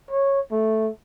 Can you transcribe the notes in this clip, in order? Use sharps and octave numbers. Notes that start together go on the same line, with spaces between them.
C#5
A3